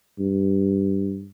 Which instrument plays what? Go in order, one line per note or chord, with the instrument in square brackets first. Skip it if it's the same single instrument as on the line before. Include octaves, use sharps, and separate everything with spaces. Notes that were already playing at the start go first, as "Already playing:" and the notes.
[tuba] G2